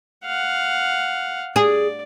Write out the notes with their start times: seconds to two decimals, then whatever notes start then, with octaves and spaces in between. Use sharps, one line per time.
0.25 F5 F#5
1.56 G#4 D5